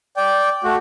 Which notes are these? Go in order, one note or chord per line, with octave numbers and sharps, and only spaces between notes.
D5 G5
A3 F#4